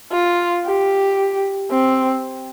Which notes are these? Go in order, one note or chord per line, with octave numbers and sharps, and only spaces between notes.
F4
G4
C4